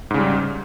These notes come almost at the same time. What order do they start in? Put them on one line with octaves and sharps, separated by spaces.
G#2 C#3 G3